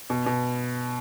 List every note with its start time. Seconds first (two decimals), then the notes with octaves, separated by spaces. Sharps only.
0.10 B2
0.26 B2